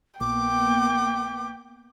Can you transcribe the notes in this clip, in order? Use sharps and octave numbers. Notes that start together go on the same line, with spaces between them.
A#1 A#3 B3 G5 D6